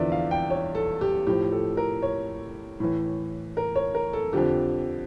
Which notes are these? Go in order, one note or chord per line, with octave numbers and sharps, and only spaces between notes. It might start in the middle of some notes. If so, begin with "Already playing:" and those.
Already playing: E2 D3 F3 D5 E5
F5
G5
C#5
A4
G4
A2 F3 G4
A4
A#4
C#5
A2 E3
A#4
C#5
A#4
A4
F2 D3 F3 G4